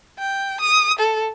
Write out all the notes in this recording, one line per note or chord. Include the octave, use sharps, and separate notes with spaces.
G5
D#6
A4